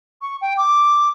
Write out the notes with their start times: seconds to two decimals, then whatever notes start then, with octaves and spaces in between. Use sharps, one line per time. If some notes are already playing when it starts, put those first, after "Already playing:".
0.22 C#6
0.41 G5
0.57 D6